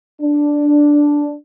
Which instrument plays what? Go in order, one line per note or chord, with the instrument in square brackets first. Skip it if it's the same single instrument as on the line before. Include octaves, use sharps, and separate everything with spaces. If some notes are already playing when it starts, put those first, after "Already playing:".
[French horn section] D4